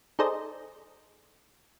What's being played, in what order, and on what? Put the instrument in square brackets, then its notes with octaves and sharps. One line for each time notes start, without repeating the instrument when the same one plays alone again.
[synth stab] D#4 G#4 A4 C5 D5 D#5